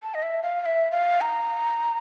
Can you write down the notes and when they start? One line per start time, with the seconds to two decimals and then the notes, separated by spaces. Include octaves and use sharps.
0.03 A5
0.14 D#5
0.23 E5
0.43 F5
0.61 F5
0.66 E5
0.91 F5
1.21 A#5